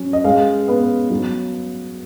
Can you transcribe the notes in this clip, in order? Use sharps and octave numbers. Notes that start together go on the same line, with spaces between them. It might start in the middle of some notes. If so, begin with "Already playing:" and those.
Already playing: F#3 C#4
D#5
G#3 F5
B3
F#3